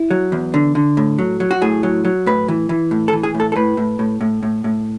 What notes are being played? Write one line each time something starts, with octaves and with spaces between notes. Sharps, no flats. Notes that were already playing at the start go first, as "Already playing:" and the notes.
Already playing: E4
F#3
E2
D3
D3
A2
F#3
F#3
F#4
A2 G#4
F#3
F#3
A2 B4
E3
E3
A2
A4
E3
G#4
A2
A4
A4
A2 B4
A2
A2
A2
A2
A2